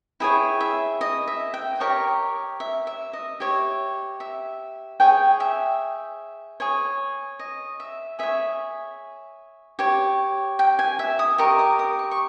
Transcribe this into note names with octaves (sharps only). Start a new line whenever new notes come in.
E4 G#4 C#5 G5
E5
D#5
E5
G5
G4 A#4 C#5 D#5
E5
E5
D#5
G4 C#5 E5
E5
G#4 C#5 G5
E5
G#4 C#5
D#5
E5
G#4 C#5 E5
G4 C#5
G5
G#5
E5
D#6
G4 A#4 D#5 C#6
D#6
D#6
C#6
C#6